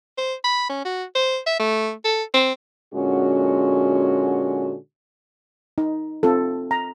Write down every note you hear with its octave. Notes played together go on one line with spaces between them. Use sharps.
C5
B5
C#4
F#4
C5
E5
A3
A4
C4
A#2 D3 G#3 C#4 F#4
D#4
C4 F4 A4
A#5